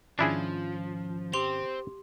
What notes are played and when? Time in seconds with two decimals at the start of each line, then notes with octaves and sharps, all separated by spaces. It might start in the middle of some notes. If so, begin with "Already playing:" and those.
0.19 G#2 D#3 F3 C#4 D4 E4 G#4
1.33 C4 G4 C6 F7